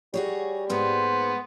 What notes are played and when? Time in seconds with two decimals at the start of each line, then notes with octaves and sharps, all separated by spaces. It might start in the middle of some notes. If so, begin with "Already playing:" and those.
0.14 G3 F#4 G#4 C#5
0.70 G#2 G#3 A#3 B3 C5